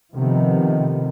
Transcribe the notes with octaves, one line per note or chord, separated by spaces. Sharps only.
C3 D#3 F3 A3 B3